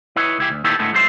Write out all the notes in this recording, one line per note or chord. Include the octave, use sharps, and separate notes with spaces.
E4 B4 C#5 D#5
C#2 E4 G4
D2
A#2 D#3 B3 E4 G4 A4
A2 D3 G#3 A3 B3
F#3 G#3 A3 B3 C5 E5